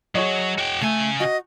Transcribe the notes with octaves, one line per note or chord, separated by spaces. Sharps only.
F#3 G#4 C#5 D#5
F#4 G5
C#3 A3 G#5
F#4 D#5